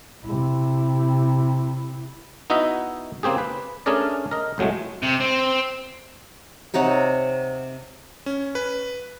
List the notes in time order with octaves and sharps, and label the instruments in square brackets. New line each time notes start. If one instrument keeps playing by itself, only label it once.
[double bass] C3 E4
[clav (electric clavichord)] B3 D#4 E4 F#4 D#5 E5
C#3 A#3 C4 G4 G#4
B4
A3 C#4 D4 G#4 A#4 D5
A#4 D#5
C2 A2 F#3 G#3 A3
[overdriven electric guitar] C3
C4
[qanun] C3 D#4 C#5 F#5
[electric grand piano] C#4
B4